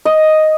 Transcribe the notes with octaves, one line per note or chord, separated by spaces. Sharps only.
D#5